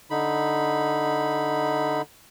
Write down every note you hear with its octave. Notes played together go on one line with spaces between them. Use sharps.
D3 D#4 B5